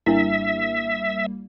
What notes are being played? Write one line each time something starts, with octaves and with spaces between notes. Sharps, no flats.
G#1 G3 A#3 D4 E4 E5